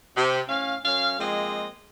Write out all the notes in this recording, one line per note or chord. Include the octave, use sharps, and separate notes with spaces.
C3
A2 C#4 F5
F#2 C#4 F5
F3 G#3 A#3 C4 D#5